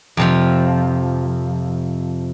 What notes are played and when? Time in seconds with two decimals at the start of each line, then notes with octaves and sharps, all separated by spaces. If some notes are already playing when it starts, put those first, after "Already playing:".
0.17 F2 C3 F3